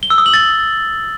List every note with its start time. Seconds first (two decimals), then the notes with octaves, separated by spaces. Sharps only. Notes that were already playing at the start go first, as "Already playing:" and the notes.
0.03 G7
0.10 E6
0.18 D#6
0.26 F#7
0.34 A6